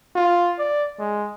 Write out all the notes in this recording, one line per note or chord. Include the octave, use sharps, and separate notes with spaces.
F4
D5
G#3